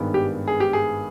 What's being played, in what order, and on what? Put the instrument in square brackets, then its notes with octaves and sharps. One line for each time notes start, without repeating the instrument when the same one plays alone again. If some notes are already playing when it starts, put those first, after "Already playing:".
Already playing: [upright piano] G#1 G2 D#3 G#3 B3
[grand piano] G4
G#4
G4
G#4